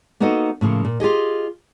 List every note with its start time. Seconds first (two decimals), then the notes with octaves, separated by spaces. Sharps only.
0.20 A#3 B3 D#4 F#4 A4 D#5
0.61 A2 C#3 F3 A#3
0.85 A#2
1.00 F4 G4 G#4 D#5